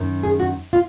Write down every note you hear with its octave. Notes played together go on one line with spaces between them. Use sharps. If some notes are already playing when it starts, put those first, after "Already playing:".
Already playing: F#2 D#3
G#4
F#4
F4